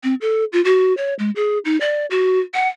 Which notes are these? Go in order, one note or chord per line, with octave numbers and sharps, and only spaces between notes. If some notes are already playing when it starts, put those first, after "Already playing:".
C4
A4
F4
F#4
C#5
G#3
G#4
D#4
D5
F#4
F#5